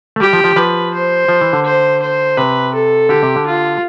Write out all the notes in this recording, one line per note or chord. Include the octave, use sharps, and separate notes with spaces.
A3
G3 G4
F3
F3
F3 B4
C5
F3
E3
D3
C5
C5
C3 B4
A4
D3 G4
C3
D3
F4